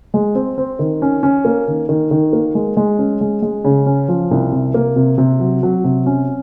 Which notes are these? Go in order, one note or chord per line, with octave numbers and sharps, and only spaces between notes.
G#3
C4
C4
D#3
C#4
C#4
A#3
D#3
D#3
D#3
A#3
G#3
G#3
C#4
G#3
G#3
C#3
C#4
F3
C2
C3
A#3
C3
C3
F#3
F#3
C3
C#4